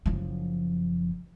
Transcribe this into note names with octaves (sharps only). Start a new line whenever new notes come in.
F#1 F3